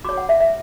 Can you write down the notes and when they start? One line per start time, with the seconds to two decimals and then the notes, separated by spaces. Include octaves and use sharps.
0.05 F#4 C#5 D6
0.18 F#5
0.29 E5
0.40 E5